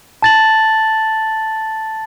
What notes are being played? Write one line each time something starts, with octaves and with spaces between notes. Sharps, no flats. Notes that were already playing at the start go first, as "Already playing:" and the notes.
A5 A6 F#7